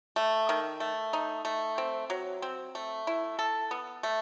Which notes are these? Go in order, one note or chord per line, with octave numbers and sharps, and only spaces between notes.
A3
D#3
A3
D#4
A3
C4
F#3
C4
A3
E4
A4
B3
A3